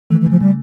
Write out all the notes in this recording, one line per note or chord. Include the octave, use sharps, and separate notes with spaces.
E3 A3
E3
C#3 F3
C#3 G3